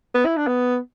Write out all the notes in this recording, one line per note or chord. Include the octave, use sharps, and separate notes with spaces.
B3
E4
D4
B3